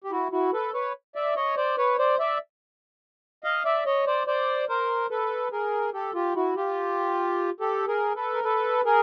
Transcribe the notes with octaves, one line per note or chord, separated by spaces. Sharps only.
G4
E4 F#4
E4 F#4
A4 B4
B4 C#5
D5 E5
C#5 D#5
C5 D5
B4 C#5
C5 D5
D5 E5
D#5 F5
D5 E5
C#5 D#5
C5 D5
C5 D5
A#4 C5
A4 B4
G#4 A#4
G4 A4
F4 G4
E4 F#4
F4 G4
G4 A4
G#4 A#4
A4 B4
A#4
A4 B4
G#4 A#4